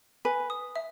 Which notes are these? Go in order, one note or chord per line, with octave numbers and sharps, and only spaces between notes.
B4 G#5
D#6
E5